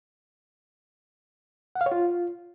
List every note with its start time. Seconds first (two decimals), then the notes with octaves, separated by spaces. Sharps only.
1.75 F#5
1.81 F5
1.86 C#5
1.92 F4